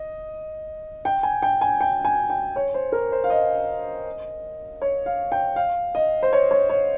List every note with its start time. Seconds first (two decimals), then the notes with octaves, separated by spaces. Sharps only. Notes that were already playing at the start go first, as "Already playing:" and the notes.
Already playing: D#5
1.05 G5
1.23 G#5
1.43 G5
1.61 G#5
1.81 G5
2.05 G#5
2.30 G5
2.56 C#5
2.74 C5
2.92 A#4
3.12 C5
3.24 F5
3.30 D#5
4.82 C#5
5.06 F5
5.32 G5
5.56 F5
5.95 D#5
6.23 C5
6.33 C#5
6.51 C#5
6.70 C#5